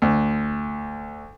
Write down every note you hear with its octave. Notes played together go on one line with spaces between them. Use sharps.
D2